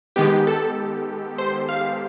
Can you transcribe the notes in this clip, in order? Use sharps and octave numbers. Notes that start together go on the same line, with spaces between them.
D#3 G#3 B3 G4
A4
C5
F5